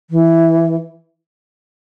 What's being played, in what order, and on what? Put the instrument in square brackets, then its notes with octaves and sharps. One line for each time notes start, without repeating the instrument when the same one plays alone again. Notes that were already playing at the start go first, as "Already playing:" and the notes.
[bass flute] E3